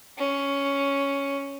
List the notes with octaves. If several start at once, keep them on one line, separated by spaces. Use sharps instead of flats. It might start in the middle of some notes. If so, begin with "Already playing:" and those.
C#4